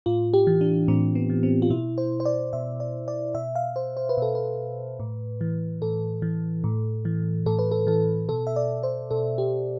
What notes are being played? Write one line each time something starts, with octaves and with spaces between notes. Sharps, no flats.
A2 F4
G4
E3
D4
A2 C4
B3
E3
C4
F4
B2 E4
C5
C5
D5
B2 E5
D5
D5
B2 E5
F5
C5
C5
B4
B2 A4
B4
A2
E3
A2 A4
E3
A2
E3
A2 A4
B4
A4
E3 A4
B2 A4
E5
D5
C5
B2 A4
G4